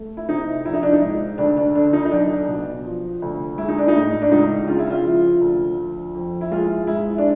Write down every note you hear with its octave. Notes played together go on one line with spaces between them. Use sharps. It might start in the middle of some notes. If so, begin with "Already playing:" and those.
Already playing: A3
E4
C3 D#4
A#1 E4
D#4
D4
D#4
G#2
D2 D4
D4
D3 D4
D#4
D#4
B1 D4
B2
F3
D2
G#3 E4
D#4
D4
D#4
A2
D4
C#2 D#4
C#3 F4
E4
F4
F3
D2
F3
F2
E4
G#3 F4
G#2 E4
D4